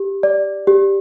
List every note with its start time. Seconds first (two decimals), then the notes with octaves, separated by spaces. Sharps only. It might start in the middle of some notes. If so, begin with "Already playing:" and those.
Already playing: G4
0.23 D5
0.67 G4